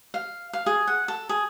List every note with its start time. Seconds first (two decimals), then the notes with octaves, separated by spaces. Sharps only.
0.14 F5
0.53 F5
0.66 G#4
0.87 F#5
1.08 A4
1.29 G#4